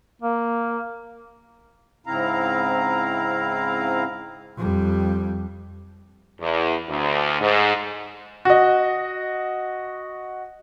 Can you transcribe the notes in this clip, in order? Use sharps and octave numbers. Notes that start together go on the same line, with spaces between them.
A#3
G#2 C#3 C4 E4 F5 A#5
F2 G3
E2
D2
G#2
F#4 D#5